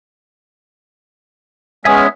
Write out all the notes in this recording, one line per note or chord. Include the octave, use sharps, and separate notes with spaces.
G#3 B3 C#4 E5 G#5 D#6